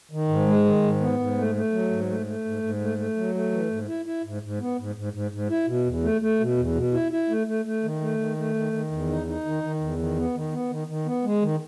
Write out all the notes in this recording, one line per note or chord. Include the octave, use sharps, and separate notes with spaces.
D#3
G#2
G#3
D#3
G#2
B3
G#2
A3
A3
F#3
G#2
A3
A3
G#2
G#2
A3
A3
F#3
A3
E3
G#2
E4
E4
G#2
G#2
B3
G#2
G#2
G#2
G#2
E4
B2
E2
A3
A3
B2
E2
B2
E4
E4
A3
A3
A3
D#3
A3
D#3
A3
D#3
D#3
E2
D#4
D#4
D#3
D#3
E2
D#3
B3
D#3
B3
D#3
D#3
B3
G#3
D#3